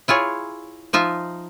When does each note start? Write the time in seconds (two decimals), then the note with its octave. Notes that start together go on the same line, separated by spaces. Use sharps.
0.08 E4 F4 G#4 C#5
0.93 F3 D#4 F4 E5